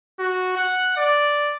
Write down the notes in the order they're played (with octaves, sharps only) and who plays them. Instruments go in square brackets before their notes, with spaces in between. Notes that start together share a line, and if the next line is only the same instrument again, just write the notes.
[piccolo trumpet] F#4
F#5
D5